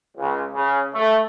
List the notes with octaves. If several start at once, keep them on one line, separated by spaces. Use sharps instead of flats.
C#2
C#3
A3